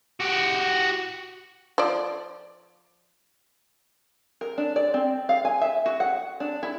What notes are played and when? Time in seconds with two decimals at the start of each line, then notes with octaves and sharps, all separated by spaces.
0.20 F#4 G4
1.78 F3 D5
4.41 A#4
4.58 D4
4.76 D5
4.94 C4
5.29 F5
5.45 G#5
5.61 E5
5.86 F#4
6.00 F#5
6.40 D4
6.63 E4